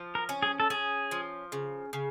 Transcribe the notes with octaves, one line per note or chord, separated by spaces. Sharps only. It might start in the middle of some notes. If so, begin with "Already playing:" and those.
Already playing: F3
A#4
C#4
G#4
A4
C#4 G#4
F3
C#3
C#3